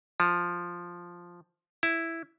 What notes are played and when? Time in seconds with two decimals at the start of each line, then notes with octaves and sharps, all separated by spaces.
0.20 F3
1.83 E4